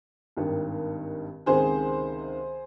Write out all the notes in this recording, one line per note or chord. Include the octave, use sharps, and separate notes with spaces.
G#1 G2 D#3
C#2 C3 D#3 G#4 C5